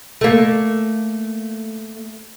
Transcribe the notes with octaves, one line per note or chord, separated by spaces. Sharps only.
A3 A#3